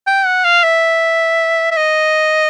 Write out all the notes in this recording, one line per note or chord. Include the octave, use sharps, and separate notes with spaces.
G5
F#5
F5
E5
E5
D#5